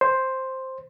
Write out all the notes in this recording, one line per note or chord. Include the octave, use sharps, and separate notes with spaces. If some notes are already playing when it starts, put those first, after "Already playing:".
C5